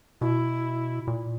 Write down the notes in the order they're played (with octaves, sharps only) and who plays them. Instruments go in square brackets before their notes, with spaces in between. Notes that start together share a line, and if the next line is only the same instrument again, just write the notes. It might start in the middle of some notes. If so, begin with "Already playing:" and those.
[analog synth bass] B2 [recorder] E4
[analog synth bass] A#2